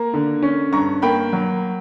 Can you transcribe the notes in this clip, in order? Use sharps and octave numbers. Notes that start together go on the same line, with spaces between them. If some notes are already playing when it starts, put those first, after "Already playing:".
Already playing: A#3 A#5
D3
C#4
G2 A#5 C#6
A#3 G5 B5
F#3